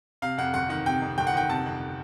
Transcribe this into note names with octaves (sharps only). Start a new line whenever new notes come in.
C3 F5
F2 F#5
G1 F#5
D#3 F#5
C3 G5
F2
G1 G5
F#5
D#3 G5
C3 A5
F2